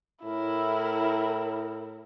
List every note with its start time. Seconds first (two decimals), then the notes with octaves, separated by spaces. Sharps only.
0.24 A2 E4 A#4